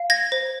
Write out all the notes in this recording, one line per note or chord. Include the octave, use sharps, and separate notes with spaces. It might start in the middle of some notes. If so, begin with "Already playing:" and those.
Already playing: F5
G#6 A#6
C5